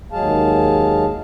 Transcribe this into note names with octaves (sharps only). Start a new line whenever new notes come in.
D#2 F#3 G#3 G#4 F5 A5